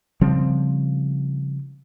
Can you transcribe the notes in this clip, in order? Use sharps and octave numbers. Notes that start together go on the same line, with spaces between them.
C#3 F3 G3 C4